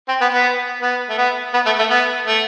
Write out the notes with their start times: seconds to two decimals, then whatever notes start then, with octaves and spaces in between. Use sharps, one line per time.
0.08 C4
0.21 B3
0.33 B3
0.82 B3
1.09 A3
1.17 B3
1.54 B3
1.66 A3
1.79 A3
1.90 B3
2.27 A3